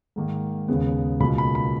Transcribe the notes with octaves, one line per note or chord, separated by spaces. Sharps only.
G#2 D#3 A#3
D#2 C#3 G#3 B3
C#2 B2 A#3 B5
B5
B5